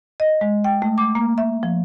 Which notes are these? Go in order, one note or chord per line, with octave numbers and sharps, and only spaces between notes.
D#5
G#3
G5
A3
D6
A#3
E5
F3